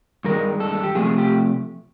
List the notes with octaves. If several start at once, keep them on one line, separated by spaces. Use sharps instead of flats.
G2 D#3 G#3 A#4
A4
G4
C3 F3 A3 G#4
G4